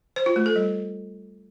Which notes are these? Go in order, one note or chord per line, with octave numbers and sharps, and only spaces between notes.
C5
F4
A3
A4
G3